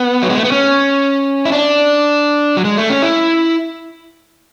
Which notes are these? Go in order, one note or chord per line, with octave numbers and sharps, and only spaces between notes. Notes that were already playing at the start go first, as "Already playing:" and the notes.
Already playing: B3
F#3
G#3
A3
B3
C#4
E4
D4
F#3
G#3
A3
C#4
E4